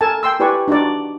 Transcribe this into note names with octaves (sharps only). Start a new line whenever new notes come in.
A4 A#4 G#5 A5
G5 C6 E6
E4 G4 B4 D5 G#5 C#6
D4 D#4 F#4 D5